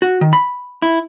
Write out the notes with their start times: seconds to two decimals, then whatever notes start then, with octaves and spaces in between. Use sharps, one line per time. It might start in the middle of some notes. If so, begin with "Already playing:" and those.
0.02 F#4
0.21 D#3
0.33 B5
0.82 E4